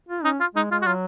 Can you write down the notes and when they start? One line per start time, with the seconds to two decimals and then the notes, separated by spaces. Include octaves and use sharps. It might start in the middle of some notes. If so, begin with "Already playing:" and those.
0.09 F4
0.24 C#4 D#4
0.40 F4
0.55 G#3 D#4
0.71 G#3 F4
0.82 F#4
0.86 F#3 F4